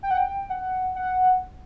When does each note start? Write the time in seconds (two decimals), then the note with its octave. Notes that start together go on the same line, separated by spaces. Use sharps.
0.03 G5
0.11 F#5
0.17 G5
0.50 F#5
0.95 F#5